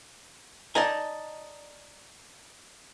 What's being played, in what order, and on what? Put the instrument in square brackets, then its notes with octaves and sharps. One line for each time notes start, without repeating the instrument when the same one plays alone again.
[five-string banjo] D#4 A5 [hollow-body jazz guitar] D5 D#5 G#5